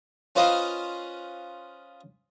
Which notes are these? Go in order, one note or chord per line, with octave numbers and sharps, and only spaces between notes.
C#4 F4 B4 C5 D#5 F5